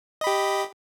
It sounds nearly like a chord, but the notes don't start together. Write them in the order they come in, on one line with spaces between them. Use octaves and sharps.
D#5 B5 G4